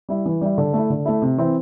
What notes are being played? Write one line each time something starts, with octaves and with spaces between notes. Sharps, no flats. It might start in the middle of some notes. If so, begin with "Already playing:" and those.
G3 E4
E3
G3 E4
D3
A3 E4
D3
A3 E4
C3
E3 C4 E4